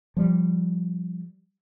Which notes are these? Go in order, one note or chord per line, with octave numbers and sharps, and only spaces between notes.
F3 G3